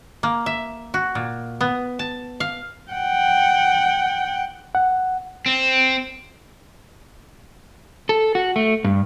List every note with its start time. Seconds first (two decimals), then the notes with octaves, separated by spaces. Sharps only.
0.23 A#3
0.46 E5
0.94 F#4
1.15 A#2
1.61 B3
1.99 A5
2.40 F5
2.91 F#5 G5
4.75 F#5
5.46 C4
8.09 A4
8.35 F#4
8.56 A3
8.84 G2